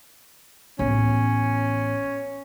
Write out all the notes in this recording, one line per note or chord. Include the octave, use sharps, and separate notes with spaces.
A1 B3 C#4